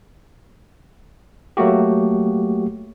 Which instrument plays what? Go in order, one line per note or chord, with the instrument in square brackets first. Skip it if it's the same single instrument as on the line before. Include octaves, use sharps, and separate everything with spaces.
[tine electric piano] F#3 A3 A#3 F#4 G4